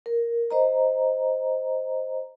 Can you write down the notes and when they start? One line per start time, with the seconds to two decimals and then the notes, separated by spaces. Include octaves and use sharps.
0.06 A#4
0.51 C5 D#5 A#5